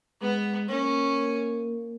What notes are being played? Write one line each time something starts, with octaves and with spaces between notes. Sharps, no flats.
G#3 B3
A#3 C#4